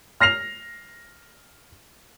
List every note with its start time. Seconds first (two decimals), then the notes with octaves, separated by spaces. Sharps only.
0.20 F6 A#6 C7 F7